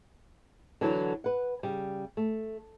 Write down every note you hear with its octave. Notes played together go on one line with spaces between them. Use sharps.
D3 E3 F#3 A4
B4 F#5
C#3 G3
A3